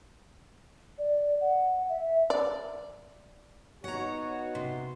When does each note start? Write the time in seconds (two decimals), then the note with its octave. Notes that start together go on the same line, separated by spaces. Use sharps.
0.98 D5
1.41 F#5
1.89 E5
2.30 D5
3.84 B3 D#4 F#4 C#5 F#5 A#5
4.55 C3 C6